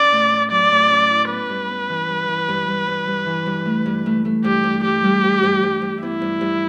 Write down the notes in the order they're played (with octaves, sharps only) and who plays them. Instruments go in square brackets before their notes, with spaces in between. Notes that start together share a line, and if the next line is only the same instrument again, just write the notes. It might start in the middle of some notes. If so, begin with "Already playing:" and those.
Already playing: [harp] C#4 [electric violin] D5
[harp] A2
C#4
[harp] F#3 [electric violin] D5
[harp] A2
C#4
E4
[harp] B3 [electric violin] B4
[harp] G2
B3
E3
G2
E3
G2
G2
G2
G2
E3
G2
A3
G2
A3
A3
[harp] G2 [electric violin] G4
[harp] G2
[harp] G3 [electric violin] G4
[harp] G3
G2
G2
G2
G2
[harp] B3 [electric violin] E4
[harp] G2
G2